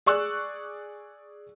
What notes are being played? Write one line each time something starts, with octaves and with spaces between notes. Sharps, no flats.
G#4 D5 C#6 E6 F#6